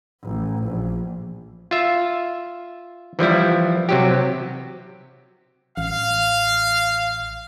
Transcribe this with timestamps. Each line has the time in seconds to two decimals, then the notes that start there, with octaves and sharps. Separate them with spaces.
0.23 A1
0.65 A#1
1.71 F4 E5
3.19 E3 F3 G3 E4
3.89 C3 F#3 G4
5.77 A1 F5